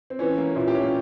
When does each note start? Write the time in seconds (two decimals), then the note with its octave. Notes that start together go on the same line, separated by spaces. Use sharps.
0.10 C4
0.19 E3 C#4
0.38 A#3
0.56 A#2 E4
0.67 G4
0.75 C#4
0.80 A#3